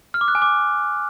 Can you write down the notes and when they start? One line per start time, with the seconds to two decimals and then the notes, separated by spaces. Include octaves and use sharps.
0.14 F6
0.21 D6
0.28 F#6
0.35 G#5
0.42 D6